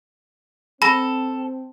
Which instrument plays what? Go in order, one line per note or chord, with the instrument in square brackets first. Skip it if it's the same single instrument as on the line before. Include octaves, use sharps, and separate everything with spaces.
[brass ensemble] C4 [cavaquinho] A4 [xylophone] B5 A#6